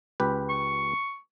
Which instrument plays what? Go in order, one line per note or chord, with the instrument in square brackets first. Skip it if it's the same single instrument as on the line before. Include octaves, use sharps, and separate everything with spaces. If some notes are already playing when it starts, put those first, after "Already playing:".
[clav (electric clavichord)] C#2 G4 B4
[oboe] C#6